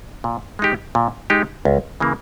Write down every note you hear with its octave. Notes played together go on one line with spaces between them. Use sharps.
A#2
G#3 D#4 G4
A#2
G#3 D#4 G4
C#2
C#3 E3 A#3